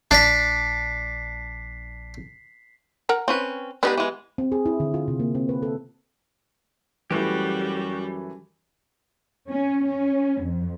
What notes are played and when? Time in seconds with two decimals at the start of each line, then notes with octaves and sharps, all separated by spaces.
0.11 A#1 D4 B6 C7
3.09 A#4 F#5 A#5
3.28 C4 C#4 B4
3.83 G#3 B3 D4 D#4 G4 B4
3.98 E3 G#3
4.38 C4
4.52 G#4
4.66 E4
4.80 D3
4.94 F4
5.08 C3
5.20 A#3
5.35 C4
5.49 B4
5.63 A4
7.11 F#2 E3 G3 A3 E4 F#4 G4
9.48 C#4
9.87 C#4
10.42 F2